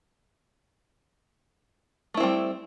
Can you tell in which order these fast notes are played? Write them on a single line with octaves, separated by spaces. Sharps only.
A3 E4 C4 G3